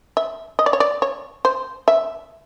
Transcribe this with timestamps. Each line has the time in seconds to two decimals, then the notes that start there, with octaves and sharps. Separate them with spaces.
0.17 E5
0.59 D#5
0.66 D5
0.73 C#5
0.80 D5
1.02 C#5
1.45 C5
1.88 E5